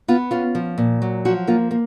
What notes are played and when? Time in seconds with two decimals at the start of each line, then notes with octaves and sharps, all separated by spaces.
0.08 B3 F4
0.31 C#4 F4
0.55 F3
0.78 A#2
1.02 F#3
1.25 F3 F#4
1.47 A#3 F4
1.71 A#3